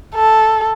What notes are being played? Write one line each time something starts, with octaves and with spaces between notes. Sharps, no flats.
A4